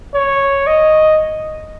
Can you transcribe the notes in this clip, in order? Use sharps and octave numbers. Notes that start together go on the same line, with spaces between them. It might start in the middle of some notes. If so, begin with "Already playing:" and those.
C#5
D#5